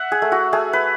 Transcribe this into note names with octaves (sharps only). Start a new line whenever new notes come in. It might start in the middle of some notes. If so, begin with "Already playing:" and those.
Already playing: E5 F#5
G#4
A3
F#4
A3 G#4
B4